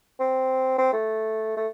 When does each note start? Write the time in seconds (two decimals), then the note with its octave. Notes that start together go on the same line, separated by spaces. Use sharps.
0.19 C4
0.78 C4
0.93 A3
1.56 A3